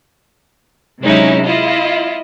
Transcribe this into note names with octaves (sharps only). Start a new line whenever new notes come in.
C3 F#3 G#3 C#4 D#4 E4
E4 F4 D#5